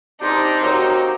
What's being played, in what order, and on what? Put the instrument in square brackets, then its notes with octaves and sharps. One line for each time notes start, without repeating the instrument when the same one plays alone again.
[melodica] C4 G5 [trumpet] D4 [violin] D#4 [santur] G4 C5
[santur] F#3 A#3 G4 [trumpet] C5